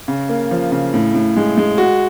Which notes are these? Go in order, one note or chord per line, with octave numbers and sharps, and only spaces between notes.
C#3
A#3
F3
C#3
A2
A2
G#3
G#3
F#4